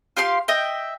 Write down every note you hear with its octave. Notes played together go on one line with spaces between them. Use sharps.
F4 G4 F5 C6
D#5 E5 G5